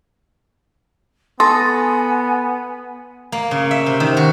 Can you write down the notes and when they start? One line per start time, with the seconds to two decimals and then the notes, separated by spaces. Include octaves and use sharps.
1.40 B3 A4 G#5 C6 D#6 A#6
3.32 A#3
3.51 C#3
3.71 E5
3.86 C3
4.00 D#3
4.17 F#4